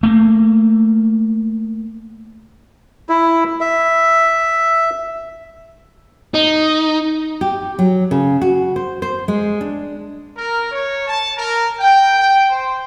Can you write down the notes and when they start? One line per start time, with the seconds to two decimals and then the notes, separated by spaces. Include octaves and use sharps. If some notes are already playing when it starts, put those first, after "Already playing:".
0.03 A3 A#3
3.09 E4
3.61 E5
6.34 D#4
7.41 G4
7.79 F#3
8.11 C#3
8.41 F#4
8.76 C5
9.02 C5
9.28 G#3
9.61 D4
10.37 A#4
10.72 C#5
11.08 A5
11.37 A#4
11.79 G5
12.19 G5
12.49 C5